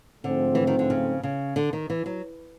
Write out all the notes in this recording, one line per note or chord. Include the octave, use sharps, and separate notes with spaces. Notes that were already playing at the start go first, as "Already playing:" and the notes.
G#2 D3 F3 A3 C4
E3
D#3
D3
C#3
C#3
D3
D#3
E3
F#3